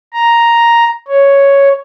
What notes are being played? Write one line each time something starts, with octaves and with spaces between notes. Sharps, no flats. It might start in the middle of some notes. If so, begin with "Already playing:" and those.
A#5
C#5